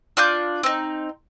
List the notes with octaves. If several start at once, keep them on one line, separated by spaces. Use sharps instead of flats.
D4 F4 D6 G6
C4 D#4